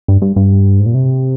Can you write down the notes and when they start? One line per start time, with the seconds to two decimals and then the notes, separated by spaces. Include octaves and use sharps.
0.08 G2
0.22 G2
0.36 G2
0.80 G#2
0.86 A#2
0.94 C3